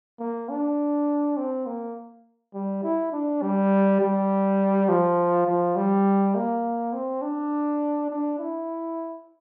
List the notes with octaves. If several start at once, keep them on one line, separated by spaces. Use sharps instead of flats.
A#3
D4
C4
A#3
G3
E4
D4
G3
G3
F3
F3
G3
A#3
C4
D4
D4
E4